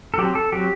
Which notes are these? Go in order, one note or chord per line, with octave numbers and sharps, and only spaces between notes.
A4
F#3 C4 G4
A4
F#3 C4 G4